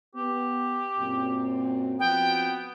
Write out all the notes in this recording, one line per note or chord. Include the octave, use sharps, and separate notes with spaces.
B3 G4
F#2 A#2 C4
F3 B3 C4 F#4 G5